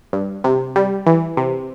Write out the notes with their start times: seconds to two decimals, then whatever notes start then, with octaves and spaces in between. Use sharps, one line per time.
0.13 G2
0.44 C3
0.76 G3
1.06 E3
1.37 C3